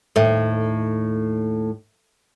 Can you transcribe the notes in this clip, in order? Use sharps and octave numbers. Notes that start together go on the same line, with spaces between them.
D#2 A2 A4 E5 G5